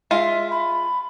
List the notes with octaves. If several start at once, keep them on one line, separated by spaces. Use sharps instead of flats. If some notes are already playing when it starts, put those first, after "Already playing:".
G#3 F4 E5
B5